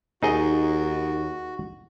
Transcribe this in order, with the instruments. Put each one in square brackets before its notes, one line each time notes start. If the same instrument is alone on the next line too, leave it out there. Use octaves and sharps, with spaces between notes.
[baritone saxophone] D#2 [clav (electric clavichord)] D#4 G#4 D#5 [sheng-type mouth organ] F#4